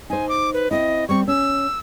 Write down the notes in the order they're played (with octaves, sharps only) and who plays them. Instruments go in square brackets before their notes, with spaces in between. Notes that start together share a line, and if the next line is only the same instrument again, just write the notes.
[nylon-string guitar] D#4 C5 [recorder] G#5
[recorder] D6
B4
[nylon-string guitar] C4 E4 [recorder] D#5
[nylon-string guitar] G3 C4 [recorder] C#6
[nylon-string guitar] C#4 [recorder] E6